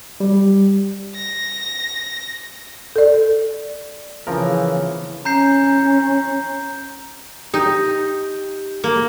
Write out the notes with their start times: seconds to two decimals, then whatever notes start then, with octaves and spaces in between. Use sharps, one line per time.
0.20 G3
1.15 A#6
2.96 A4 D5
4.27 C#3 E3 F3 A#4
5.25 C#4 A#5 G6 C7
7.54 D#4 G4
8.84 A#3